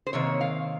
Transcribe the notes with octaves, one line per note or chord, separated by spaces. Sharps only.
C5
C3 D#3 A#3 C#5
F5